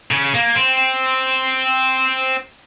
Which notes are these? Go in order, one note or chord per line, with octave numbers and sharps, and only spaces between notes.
C#3
A#3
C4